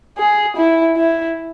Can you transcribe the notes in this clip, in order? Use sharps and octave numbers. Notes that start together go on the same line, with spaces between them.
G#4
E4
E4